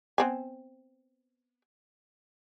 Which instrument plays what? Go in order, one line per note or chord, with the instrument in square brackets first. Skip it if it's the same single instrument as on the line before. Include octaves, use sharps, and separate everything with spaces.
[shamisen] B3 C4 G#5